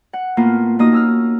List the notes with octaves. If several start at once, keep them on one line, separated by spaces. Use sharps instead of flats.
F#5
A2 A#3 B3 F4
A#3 D#4 F#4 D#5 D#6
C#4 E6 F6